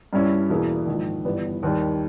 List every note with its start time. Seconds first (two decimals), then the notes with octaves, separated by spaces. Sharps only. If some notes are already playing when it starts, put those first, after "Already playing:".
0.13 G2 G3 C#4 E4
0.50 E2 B2 A#3 E4 G#4
0.87 A#1 G#2 D#3
1.25 G1 G2 E3 G3 B3
1.63 D#2 D#3 G3